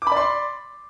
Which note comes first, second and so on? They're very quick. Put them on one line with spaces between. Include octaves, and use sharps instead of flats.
D6 B5 D5 C6